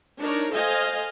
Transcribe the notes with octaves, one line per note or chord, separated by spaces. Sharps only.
D4 D#4 A#4 C#5
A4 C5 D#5 F5 G#5